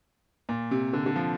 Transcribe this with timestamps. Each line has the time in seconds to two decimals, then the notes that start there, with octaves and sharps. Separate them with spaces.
0.49 A#2
0.71 C3
0.93 D3
1.06 D3
1.16 F3